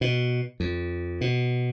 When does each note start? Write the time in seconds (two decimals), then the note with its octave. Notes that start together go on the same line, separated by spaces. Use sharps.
0.01 B2
0.60 F2
1.21 B2